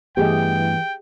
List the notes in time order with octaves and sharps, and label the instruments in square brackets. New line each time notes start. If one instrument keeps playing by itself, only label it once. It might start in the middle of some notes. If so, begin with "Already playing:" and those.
[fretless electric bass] G2 A3 B3 [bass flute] E3 [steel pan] G4 G#4 D#5 [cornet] G5